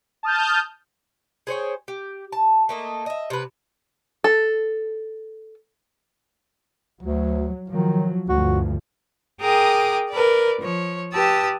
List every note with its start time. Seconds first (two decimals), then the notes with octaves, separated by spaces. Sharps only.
0.23 A5 D#6 F6 G6
1.47 G#4 C5 C#5 G5
1.88 G4
2.32 A5
2.69 A3 A#3 D#5
3.06 D#5 E5
3.30 C3 B4
4.24 A4
7.03 D2 F#3
7.70 D#3 F3 F#3
8.29 D2 G2 F3 F#4
9.41 G#4 A#4 G5 A#5 D6 D#6
10.10 A#4 B4 D5
10.60 F3 C#5
11.13 G4 B4 A5 D#6 E6